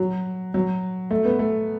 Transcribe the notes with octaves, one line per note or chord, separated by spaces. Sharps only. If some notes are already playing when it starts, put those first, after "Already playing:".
Already playing: F#3
F#3
A3
B3
A3